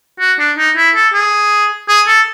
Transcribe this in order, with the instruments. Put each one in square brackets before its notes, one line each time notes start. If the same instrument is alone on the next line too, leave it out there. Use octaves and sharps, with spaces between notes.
[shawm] F#4
D4
D#4
E4
A4
G#4
G#4
A4